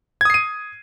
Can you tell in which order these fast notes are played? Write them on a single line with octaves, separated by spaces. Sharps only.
G#6 D#6 C7 D#7